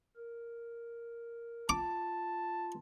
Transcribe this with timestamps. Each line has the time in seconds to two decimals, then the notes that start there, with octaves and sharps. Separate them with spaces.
0.16 A#4
1.69 F4 A5 D6